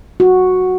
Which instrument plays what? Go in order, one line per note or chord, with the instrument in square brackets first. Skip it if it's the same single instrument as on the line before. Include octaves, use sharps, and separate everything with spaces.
[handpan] F#4